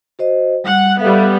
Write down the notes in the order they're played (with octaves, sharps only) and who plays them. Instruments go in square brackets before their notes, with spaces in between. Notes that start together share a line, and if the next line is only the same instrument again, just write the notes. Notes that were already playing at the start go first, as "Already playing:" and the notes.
[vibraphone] F#4 C5 D#5
[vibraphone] G3 [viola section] F#5
[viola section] G3 B3 [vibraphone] A4 E5 F5